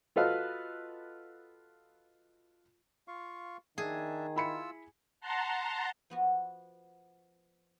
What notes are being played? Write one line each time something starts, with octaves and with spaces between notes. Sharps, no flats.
F4 F#4 A4 B4 D#5 F5
F4 F5 C#6
D#3 D4 G#4 E5 A5
E4 F4 B5 E6 C#7
F#5 A5 A#5 C6
F3 B3 F#4